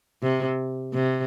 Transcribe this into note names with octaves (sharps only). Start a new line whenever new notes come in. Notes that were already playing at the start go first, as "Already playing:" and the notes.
C3
C3